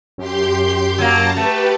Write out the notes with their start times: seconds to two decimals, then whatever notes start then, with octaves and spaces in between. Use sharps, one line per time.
0.18 F#2 G4 C6 G6
0.98 F#3 A#3 A5 A#5
1.37 A3 G4 B4